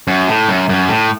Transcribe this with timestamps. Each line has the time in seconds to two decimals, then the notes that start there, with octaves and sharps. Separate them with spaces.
0.07 F#2
0.28 A2
0.49 F#2
0.69 F#2
0.89 A2